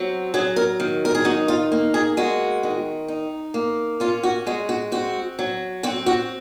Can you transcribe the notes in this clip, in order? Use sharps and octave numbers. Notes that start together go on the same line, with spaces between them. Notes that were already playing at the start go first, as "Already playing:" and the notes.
Already playing: F#3 C4
F#3 G#4
A#4
D#3
A#4
G#4
D#4 F#4
F4
A#3
G#4
G#3 F#4
D#3
D#4
A#3
C#4 F4
F#4
G#3 F#4
F#4
C4 F#4
F#3
C4 F#4
F#4